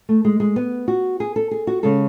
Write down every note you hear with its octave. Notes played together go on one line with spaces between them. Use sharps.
A3
G#3
G#3
B3
F#4
G#4
A4
G#4
F#4
C#3 G#3 A4